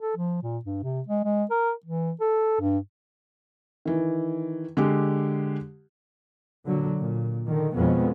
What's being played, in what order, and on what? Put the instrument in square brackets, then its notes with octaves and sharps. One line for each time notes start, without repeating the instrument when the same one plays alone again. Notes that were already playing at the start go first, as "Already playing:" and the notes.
[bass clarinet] A4
F3
A#2
G2
C3
G#3
G#3
A#4
E3
A4
G2
[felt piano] D#3 E3
D3 G#3 G4
[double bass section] A#2 D3 F#3
A#2
D3 D#3
F2 B2 G#3 B3 C#4